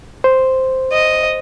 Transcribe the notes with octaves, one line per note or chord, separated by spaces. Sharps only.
C5
D#5